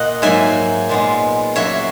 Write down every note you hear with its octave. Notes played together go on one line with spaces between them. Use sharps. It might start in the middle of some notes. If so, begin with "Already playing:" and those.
Already playing: A#2 A#3 D#5 F#5
G#2 F#3 A#3 E5 G#5
A#2 G#3 B3
C#3 F#3 A#3 C#5 E5